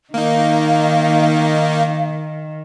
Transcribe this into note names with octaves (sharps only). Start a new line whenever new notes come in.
D#3 A#3 D#4 F5